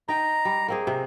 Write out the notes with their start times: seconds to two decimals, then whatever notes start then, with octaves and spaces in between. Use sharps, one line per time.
0.08 D#4 G5 A#5
0.45 G3
0.68 A#3 C4 G#4
0.87 C3